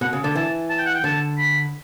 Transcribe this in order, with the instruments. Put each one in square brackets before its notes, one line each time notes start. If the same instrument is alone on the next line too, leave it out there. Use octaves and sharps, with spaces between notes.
[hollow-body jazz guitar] B2 [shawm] F#5
[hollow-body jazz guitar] C#3
[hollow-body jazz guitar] D3 [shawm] A5
[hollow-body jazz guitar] E3 [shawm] A5
[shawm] A5
G5
F#5
G5
[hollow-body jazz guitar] D3 [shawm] A5
[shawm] B5